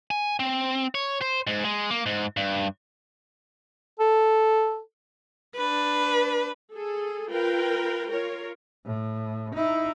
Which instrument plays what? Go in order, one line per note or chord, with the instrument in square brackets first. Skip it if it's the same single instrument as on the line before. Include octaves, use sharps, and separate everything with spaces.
[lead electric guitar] G#5
C4
C#5
C5
G#2
G#3
A#3
G#2
G2
[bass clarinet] A4
[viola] D4 B4
[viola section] G#4 A4
F4 A#4 B4 G5
F4 A#4 C#5
[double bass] A2
D#4 E4